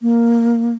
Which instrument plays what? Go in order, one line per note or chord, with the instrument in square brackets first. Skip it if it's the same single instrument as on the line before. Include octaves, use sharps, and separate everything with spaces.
[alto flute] A#3